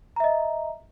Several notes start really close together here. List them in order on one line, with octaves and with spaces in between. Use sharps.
A#5 E5 D#5